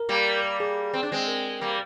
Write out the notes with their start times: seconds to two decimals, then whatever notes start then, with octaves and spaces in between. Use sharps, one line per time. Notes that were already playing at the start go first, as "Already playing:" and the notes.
Already playing: A#4
0.09 G3 A#3
0.60 G#4
0.93 C4
1.03 D4
1.12 G#3 C4
1.28 A#4
1.61 G3 A#3